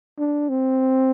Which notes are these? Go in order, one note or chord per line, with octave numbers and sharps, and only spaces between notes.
D4
C4